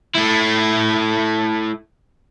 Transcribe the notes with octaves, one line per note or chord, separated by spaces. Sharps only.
A3 E4